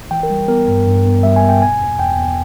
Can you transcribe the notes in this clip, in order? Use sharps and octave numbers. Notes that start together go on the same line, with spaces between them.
E3 G5
A#4
G3
B3 A#4
G2
G2
B3
G3 E5
G#5
B3
G5
B2 G#5
E2
E2 G5
E2